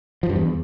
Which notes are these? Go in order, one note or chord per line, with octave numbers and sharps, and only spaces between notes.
F3
G2
E2